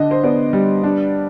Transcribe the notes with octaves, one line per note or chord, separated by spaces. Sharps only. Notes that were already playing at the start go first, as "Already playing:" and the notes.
Already playing: D3 D4 D#5
C5
B3 D5
G3
D4